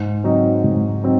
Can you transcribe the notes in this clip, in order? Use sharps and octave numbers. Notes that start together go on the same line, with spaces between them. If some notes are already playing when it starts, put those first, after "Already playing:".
Already playing: G#2
F#3 C4 D#4
G#2
F#3 C4 D#4